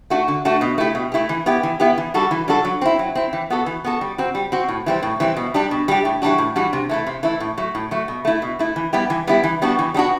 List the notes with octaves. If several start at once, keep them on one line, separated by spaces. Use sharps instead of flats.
A3 D4 F#4
D3
A3 D4 F#4
B2
A3 E4 G4
B2
A3 E4 G4
E3
B3 E4 G4
E3
B3 E4 G4
E3
G3 D4 F#4 A4
E3
G3 D4 F#4 A4
F#3
C4 E4
F#3
C4 E4
E3
B3 F#4 A4
E3
B3 F#4 A4
G3
C4 F#4
G3
C4 F#4
A2
E3 G3 C4
A2
E3 G3 C4
B2
G3 D4 G4
B2
G3 D4 G4
A2
E3 G3 D4 F#4
A2
E3 G3 D4 F#4
C3
E3 A3 E4
C3
E3 A3 E4
A2
F#3 A3
A2
F#3 A3
B2
A3 E4
B2
A3 E4
E3
G3 B3 E4 G4
E3
G3 B3 E4 G4
E3
G3 B3 D4 F#4
E3
G3 B3 D4 F#4